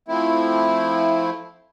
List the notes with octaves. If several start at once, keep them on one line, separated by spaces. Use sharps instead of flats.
F3 A3 C4 E4